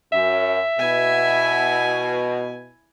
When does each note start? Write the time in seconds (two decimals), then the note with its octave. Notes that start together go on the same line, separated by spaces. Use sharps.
0.12 F#2 E5
0.79 B2 E4 G#5